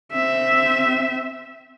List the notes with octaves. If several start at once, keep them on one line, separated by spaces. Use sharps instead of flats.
C4 E5